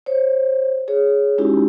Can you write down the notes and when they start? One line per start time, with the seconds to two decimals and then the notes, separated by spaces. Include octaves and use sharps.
0.06 C5 C#5
0.88 G#4 C#5
1.38 G#3 C#4 D#4 E4 F#4 G4